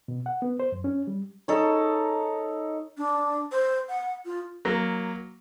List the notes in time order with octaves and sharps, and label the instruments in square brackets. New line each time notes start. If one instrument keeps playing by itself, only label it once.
[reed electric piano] B2
F#5
B3
C5
F#2
C#4
G3
[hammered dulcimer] D#4 A4 C#5
[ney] D4
C5
F#5
F4
[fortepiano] F#3 A#3